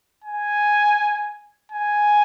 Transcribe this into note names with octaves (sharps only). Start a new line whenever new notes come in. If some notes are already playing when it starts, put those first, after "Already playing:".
G#5
G#5